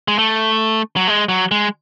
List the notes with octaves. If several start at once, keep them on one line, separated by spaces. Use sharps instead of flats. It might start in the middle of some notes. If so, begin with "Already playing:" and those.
G#3
A3
F#3
G#3
F#3
G#3